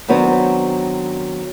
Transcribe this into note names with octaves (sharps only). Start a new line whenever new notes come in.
D#3 F#3 B3 C4 D4